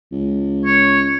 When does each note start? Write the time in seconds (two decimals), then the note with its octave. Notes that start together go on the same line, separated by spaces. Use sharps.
0.12 C#2
0.65 C#5